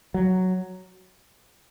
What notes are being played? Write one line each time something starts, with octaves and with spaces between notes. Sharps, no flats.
F#3